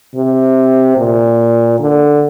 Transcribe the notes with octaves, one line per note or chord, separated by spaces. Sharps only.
C3
A#2
D3